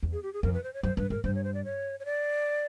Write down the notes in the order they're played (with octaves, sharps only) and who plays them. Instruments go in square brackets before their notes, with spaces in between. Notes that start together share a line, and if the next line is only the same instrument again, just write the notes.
[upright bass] E2
[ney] G#4
G4
G#4
[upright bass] F2 [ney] A#4
[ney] B4
C5
C#5
[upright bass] F#2 [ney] C5
[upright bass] G2 [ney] B4
[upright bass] G#2 [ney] A#4
[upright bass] G2 [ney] C5
[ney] C#5
C5
D5
C#5
C#5
D5